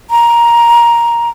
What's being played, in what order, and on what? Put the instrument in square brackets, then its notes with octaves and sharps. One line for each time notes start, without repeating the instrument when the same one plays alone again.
[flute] A#5